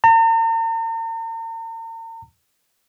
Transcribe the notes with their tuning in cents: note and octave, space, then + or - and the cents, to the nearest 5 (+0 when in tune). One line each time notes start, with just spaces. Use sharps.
A#5 -45